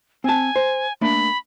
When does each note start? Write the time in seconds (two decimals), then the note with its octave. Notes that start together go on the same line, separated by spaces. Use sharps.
0.24 C4 G#5 A5
0.56 C5
1.01 A3 A#3 D4 B5